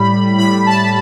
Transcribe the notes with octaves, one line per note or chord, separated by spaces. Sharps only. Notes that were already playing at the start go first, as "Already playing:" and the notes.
Already playing: A2 G3 B5
A2 G3 B5
A5